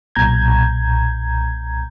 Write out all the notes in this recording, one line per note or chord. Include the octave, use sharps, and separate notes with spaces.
B1 A#2 A#5 G6 G#6